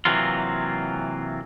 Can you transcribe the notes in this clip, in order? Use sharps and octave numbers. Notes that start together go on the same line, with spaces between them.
C3 E3 F#3 A#3 F4